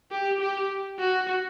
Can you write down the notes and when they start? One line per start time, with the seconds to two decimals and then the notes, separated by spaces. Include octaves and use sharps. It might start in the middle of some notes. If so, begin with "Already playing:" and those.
0.11 G4
0.40 G4
0.99 F#4